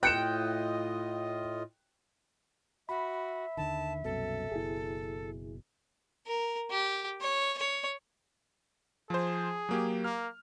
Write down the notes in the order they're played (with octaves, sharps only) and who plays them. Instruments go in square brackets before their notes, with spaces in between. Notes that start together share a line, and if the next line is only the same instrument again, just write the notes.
[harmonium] A2 F4 D#5 [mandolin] G5 [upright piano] F#6 C#7 E7
[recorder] F#4 [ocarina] E5 [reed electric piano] B5
[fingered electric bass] D#2 D3 D#3 [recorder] A5
[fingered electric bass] C2 F#2 B2 [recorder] A4
[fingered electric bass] F#1 B2 [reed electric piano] E4 G#4
[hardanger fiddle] A#4
G4
C#5
C#5
[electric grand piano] F3 C5 [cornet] G#4
[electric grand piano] F#3 A#3 G4
[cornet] A#3 [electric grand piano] F6